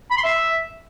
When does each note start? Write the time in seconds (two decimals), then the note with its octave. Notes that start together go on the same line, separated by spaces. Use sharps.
0.11 B5
0.18 C6
0.24 E5